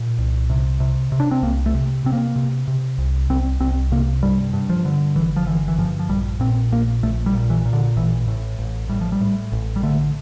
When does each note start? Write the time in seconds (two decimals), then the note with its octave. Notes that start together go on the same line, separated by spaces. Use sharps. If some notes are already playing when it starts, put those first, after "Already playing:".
Already playing: A#2
0.18 C2
0.50 C3
0.80 C3
1.12 C3
1.20 D4
1.31 C4
1.42 C2 A#3
1.66 A3
1.74 C3
2.04 C3 C4
2.12 A#3
2.36 C3
2.68 C3
2.98 C2
3.30 C2 C4
3.60 C2 C4
3.92 C3 A#3
4.23 G2 G3
4.53 G2
4.70 F3
4.85 D3
5.16 G1 E3
5.36 F3
5.47 D3 E3
5.68 E3
5.78 G2 F3
6.00 F3
6.09 A#1 G3
6.40 A#2 C4
6.72 A#1 A#3
7.03 A#1 A3
7.26 G3
7.34 A#2
7.50 E3
7.65 A#2
7.73 D3
7.96 A1 E3
8.27 A2
8.59 A1
8.89 A2 G3
9.01 F3
9.12 G3
9.21 A2
9.52 A1
9.76 G3
9.83 D3 A3